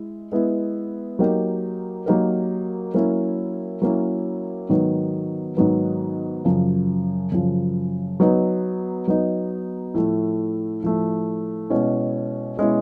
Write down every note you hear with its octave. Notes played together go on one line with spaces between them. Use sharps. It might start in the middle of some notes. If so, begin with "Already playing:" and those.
Already playing: G#3 E4
G#3 B3 E4
F#3 A#3 D#4 G4 A#4
F#3 A#3 D#4 G4 A#4
F#3 A#3 C#4 E4
F#3 A#3 C#4 E4
G#2 D#3 F#3 B3
G#2 D#3 F#3 B3
F#2 C#3 F3
F#2 C#3 F3
F#3 B3 D#4
F#3 B3 D#4
A2 F3 A3
A2 F3 A3
B2 G#3 C#4 E4
B2 G#3 C#4 E4